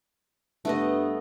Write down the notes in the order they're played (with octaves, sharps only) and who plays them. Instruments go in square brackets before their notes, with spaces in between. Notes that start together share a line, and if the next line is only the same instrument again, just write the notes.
[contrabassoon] G2 [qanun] A3 B3 D#5